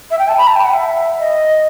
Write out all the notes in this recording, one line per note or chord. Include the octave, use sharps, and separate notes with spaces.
E5
G5
A5
B5
A5
G5
F#5
E5
D#5